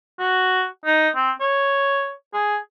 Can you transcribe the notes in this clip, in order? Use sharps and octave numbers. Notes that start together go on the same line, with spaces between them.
F#4
D#4
C4
C#5
G#4